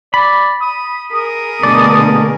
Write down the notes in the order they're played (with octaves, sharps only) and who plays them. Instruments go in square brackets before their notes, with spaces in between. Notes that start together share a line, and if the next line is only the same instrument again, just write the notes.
[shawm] D5 [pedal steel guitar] B5
[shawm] D#6
[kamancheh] G#4 A#4 [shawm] D#6
[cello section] B2 D3 A#3 [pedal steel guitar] A3 A4 D5